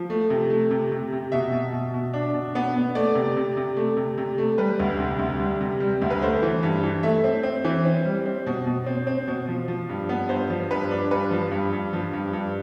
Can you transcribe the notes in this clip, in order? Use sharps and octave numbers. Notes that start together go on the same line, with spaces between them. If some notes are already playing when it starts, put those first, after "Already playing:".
Already playing: F3
A3
C3
A3
C3
C3
C3
B2 E5
B2
B2
B2
D4
B2
B3
B3
A3 D5
C3
C3
C3
A3
C3
C3
A3
G3 B4
D2
C3
D2
G3
C3
G3
D2
B4
A3 C5
E3
G2
E3
A3 E5
C4
C4
E3
C4
G3
C4
B2
B2
C4
C4
B2
F3
F3
G2
B3
G2 C5
F3
G2 B4
D4
G2 B4
F3
G2
G2
F3
G2
G2